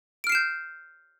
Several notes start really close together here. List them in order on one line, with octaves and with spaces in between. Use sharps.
D7 F6 C7 E7 G6